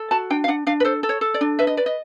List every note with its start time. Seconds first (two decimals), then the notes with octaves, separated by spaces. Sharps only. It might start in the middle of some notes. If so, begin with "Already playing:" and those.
Already playing: A4
0.11 F#4 A5
0.30 D4 G5
0.44 F5
0.48 D4 F#5
0.67 D4 F5
0.80 B4
0.85 A4 C5
1.03 A4
1.09 C#5
1.21 A4
1.34 D5
1.41 D4
1.59 B4 E5
1.67 D#5
1.77 B4 D5
1.86 D#5